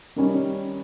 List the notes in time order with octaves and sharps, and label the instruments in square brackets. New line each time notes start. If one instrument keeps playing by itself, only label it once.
[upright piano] D#3 G3 C#4